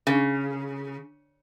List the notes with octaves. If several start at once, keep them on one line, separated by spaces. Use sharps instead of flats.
C#3